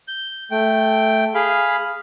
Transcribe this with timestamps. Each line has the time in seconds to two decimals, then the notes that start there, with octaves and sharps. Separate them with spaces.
0.08 G6
0.51 A3 G5
1.35 G#4 F5 B5